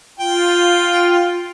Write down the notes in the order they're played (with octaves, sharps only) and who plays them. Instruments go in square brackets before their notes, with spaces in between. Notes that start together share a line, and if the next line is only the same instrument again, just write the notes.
[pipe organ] F4 [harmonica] G5